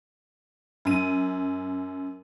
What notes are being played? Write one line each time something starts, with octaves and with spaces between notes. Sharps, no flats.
F#2 D#7